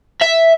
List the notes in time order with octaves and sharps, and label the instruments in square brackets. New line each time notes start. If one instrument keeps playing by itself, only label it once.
[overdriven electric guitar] E5